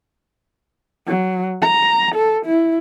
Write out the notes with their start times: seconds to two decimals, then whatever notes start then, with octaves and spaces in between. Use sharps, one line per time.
1.07 F#3
1.61 A#5
2.15 A4
2.45 E4